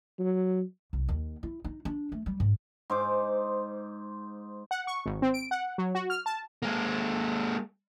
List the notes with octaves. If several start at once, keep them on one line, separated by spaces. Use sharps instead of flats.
F#3
C2
D#2
E4
D#4
D4
A3
G3
G#2
G#2 C5 D6
F#5
C#6
G#1
C4
D7
F#5
F#3
F#4
F6
A5
G#3 A#3